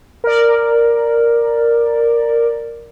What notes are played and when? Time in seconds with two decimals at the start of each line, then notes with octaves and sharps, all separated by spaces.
0.24 A#4 D5